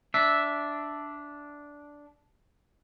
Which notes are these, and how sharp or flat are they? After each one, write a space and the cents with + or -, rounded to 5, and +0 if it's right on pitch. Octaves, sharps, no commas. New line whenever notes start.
D4 -10 E5 +0